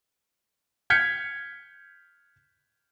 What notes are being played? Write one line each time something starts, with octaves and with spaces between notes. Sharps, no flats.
F6 G6 G#6 B6 C#7